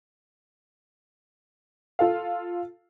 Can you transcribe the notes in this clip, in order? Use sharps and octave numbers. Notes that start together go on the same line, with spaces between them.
F4 A4 F5